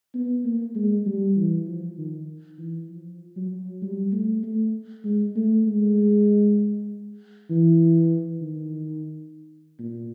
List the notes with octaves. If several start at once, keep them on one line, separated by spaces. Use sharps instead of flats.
B3
A#3
G#3
G3
E3
F3
D#3
E3
F3
F#3
G3
A3
A3
G#3
A3
G#3
E3
D#3
A#2